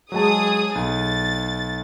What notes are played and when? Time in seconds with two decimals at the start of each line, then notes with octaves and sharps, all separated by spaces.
0.12 F#3 G#3 G#4 A5 D#6
0.75 B1 A6